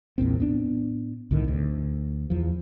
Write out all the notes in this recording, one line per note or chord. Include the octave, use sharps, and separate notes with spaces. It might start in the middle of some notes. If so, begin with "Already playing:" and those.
A#1 E2 A#2 C4
A2 B3 D4
C2 A2 D3 D#3
D2
E2 F3